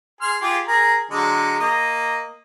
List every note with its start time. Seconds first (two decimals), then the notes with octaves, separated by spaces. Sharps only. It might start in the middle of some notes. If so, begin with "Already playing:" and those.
0.21 G#4 C6 F6
0.42 F4 G4 G#4
0.68 G#4 A#4
1.11 D3 F#3 G#3
1.59 A#3 D#5